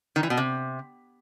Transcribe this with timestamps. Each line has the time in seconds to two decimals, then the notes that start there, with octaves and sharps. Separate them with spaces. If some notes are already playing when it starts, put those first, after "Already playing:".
0.16 D#3
0.23 E3
0.30 B2
0.37 C3